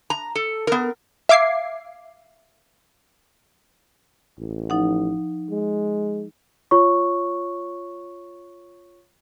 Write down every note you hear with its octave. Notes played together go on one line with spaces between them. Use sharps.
A#5
A4
B3 A#4
E5 F5 D6 G#6 C7
A1
F3 D#4 F#5
G#3
F4 C#5 C#6